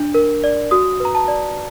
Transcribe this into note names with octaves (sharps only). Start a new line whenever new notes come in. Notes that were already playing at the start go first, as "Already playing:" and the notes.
Already playing: D4
A#4
D5
F#4 D#6
B4 A#5
A5
D5